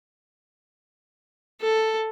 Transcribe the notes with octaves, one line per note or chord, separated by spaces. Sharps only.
A4